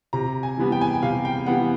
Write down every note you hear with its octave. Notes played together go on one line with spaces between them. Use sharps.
C3 A#5
G#5
E3 G3 B3
G5
G#5
G5
C3 F5
G5
E3 G3 B3 F#5